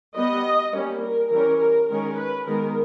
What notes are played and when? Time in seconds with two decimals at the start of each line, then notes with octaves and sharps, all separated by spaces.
0.16 G3 B3 D#5
0.74 G3 A#3 C#4
1.02 A#4
1.31 E3 G3 C#4 A#4
1.60 A#4
1.90 D#3 G#3 C#4 A#4
2.18 B4
2.47 D#3 G#3 B3 A#4